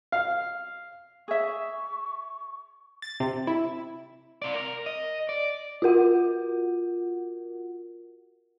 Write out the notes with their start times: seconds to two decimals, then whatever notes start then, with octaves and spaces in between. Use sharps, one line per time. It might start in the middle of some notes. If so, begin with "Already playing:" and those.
0.12 F5
1.28 G#4 E5 C#6
3.02 A6
3.20 C3
3.47 E4
4.42 C3 D5
4.54 A#4
4.86 D#5
5.29 D5
5.82 F4 F#4 A#4 F#5